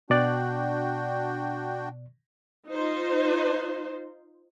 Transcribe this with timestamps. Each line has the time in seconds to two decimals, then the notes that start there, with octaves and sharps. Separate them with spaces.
0.10 B2 D4 F#4 D5 G5 F#6
2.67 D#4 F4 C5